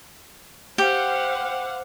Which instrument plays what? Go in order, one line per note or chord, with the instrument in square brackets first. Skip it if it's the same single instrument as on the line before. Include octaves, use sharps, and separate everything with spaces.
[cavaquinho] G4 [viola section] C5 F5 F#5